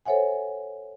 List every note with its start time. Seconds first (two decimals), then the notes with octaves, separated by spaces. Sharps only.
0.06 A4 C5 C#5 E5 F#5 G#5